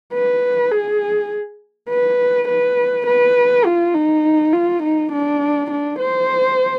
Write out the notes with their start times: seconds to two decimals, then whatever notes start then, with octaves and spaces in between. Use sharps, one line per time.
0.13 B4
0.71 G#4
1.89 B4
2.48 B4
3.07 B4
3.65 F4
3.94 D#4
4.52 F4
4.82 D#4
5.12 D4
5.71 D4
5.99 C5